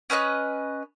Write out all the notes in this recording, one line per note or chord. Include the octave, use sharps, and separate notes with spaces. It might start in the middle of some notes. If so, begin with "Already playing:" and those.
C#4 B4 D#5 F#6